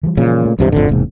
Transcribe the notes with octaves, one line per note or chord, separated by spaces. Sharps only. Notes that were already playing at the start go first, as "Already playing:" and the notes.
E3 F3 G3
A#2 C#3
A3
C#2 G2 C3 E3
G#1 F2 A2 D3
E1 G#2 C3 A#3